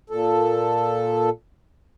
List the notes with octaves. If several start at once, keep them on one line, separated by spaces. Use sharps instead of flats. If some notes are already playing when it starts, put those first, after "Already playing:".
A#2 A4